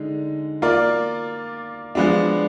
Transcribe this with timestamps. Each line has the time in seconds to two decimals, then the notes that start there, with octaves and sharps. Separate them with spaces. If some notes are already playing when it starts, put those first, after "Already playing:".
Already playing: D3 G#3 D#4
0.62 A#3 F4 A#4 D5
1.95 F3 G#3 B3 D4